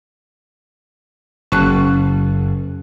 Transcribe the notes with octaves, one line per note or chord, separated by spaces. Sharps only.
F#1 C#4 A5 F#6